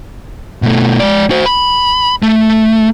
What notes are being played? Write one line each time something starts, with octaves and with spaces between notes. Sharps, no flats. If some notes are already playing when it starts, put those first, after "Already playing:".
B2 A3
G#3 D5
F#4 C5
B5
A3